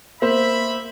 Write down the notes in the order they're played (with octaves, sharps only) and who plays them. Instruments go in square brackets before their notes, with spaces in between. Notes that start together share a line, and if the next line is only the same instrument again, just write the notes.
[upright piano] A#3 C5 [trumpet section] E5 B5